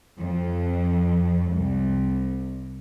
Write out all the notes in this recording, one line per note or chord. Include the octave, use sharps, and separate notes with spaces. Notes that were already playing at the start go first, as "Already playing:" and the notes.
F2
C2